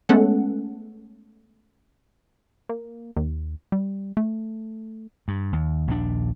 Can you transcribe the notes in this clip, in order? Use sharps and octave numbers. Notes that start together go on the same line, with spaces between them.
G#3 A3 B3 C#4 A4 F#5
A#3
D#2
G3
A3
G2
D#2
A#1 D#2 E3 D4